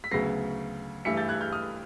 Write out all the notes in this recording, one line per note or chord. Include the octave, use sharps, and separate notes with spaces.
B6
D2 C#3 F#3 B3 A#6 C7
G2 E3 A3 B6 C#7
G6 A6
F#6 G#6
F6 G6
D#6 F6